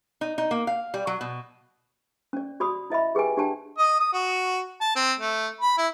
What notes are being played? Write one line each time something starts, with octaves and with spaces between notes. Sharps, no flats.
D#4
D#4
A#3
F5
G3
F#3
B2
C#4 D5
F#4 D5 B5 D#6
E4 D#5 E5 B5
G4 G#4 B4 G5 G#5
D4 G4 D5 G5 A5
D#5
D#6
F#4
A5
C4
A3
B5
E4